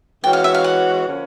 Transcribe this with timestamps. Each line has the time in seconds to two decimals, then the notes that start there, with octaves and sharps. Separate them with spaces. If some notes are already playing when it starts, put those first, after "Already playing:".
0.23 E3 G#3 C#4 F#4 G5
0.33 F5
0.44 E5
0.54 F5
0.64 F#5
1.06 D3 F3 A#3 C#4